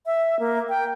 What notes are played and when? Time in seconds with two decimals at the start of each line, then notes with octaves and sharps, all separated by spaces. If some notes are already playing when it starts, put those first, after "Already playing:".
0.06 E5
0.39 A#3
0.69 G5